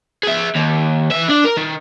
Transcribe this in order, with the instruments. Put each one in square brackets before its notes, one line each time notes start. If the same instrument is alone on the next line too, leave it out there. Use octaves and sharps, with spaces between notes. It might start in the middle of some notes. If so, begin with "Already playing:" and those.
[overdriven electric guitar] G#4 E5
D#2
E3 E5
D4 D5
A#4
D#3